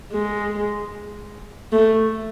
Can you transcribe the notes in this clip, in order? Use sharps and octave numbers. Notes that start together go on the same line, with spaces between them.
G#3
A3